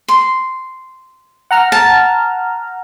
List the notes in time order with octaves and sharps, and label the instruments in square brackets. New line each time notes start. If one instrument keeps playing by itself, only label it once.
[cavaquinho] C6
[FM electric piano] F#5 A#5 F6
[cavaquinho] A5